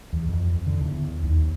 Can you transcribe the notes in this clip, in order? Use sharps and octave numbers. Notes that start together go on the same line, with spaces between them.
E2
F2
D3
E2
D#2